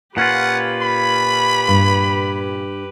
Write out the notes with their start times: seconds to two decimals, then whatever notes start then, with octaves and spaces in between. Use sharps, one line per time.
0.17 A#2 C#4 F4 G4 B4 F#5
0.82 B5
1.68 G2